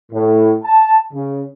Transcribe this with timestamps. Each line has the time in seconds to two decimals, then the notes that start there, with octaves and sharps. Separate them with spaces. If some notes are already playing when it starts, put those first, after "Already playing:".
0.12 A2
0.64 A5
1.14 C#3